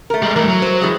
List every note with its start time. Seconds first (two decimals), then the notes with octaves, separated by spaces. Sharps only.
0.10 A3 A#4
0.22 G3 G#3
0.36 E3 A3 A#4
0.48 F#3
0.62 C5
0.81 E3 G3 G#3